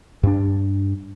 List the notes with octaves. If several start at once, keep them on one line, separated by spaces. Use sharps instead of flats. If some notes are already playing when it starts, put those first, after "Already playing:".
G2 D4